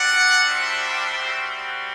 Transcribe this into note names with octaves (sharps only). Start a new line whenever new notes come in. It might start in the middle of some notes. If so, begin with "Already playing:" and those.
Already playing: G3 D4 F#4 D5 F#5
C5 E5
G3 C4 F#4